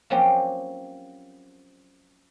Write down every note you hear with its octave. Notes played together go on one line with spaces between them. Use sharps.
F3 F#3 A#3 C4 C#4 G4